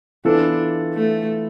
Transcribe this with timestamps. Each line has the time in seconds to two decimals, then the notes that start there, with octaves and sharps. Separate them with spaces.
0.25 E3 B3 D4 F4 A4
0.94 A3